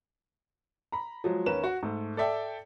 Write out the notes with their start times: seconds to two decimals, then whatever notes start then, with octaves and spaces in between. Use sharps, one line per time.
0.92 A#5 B5
1.24 F3 F#3 G#3
1.46 D#2 C#4 A#4 B4 E7
1.64 F#4
1.83 G#2 A3
2.17 A4 D5 E5 G5 A5